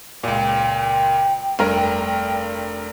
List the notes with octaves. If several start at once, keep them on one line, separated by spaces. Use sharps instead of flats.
C#2 A#2 G5
F1 G2 A#4